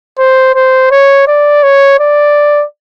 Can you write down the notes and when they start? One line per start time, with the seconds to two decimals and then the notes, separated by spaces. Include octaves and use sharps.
0.18 C5
0.55 C5
0.91 C#5
1.27 D5
1.63 C#5
1.99 D5